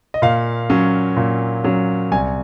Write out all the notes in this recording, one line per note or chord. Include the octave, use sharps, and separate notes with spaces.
D#5
A#2 F5
F#3 C#4
A#2
F#3 C#4
C2 G#5